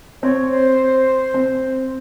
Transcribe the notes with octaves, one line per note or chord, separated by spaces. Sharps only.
C4 C#5
C5
C4